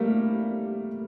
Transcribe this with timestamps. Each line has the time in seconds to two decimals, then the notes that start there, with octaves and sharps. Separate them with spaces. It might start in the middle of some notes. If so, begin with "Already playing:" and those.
Already playing: G3 A3 A#3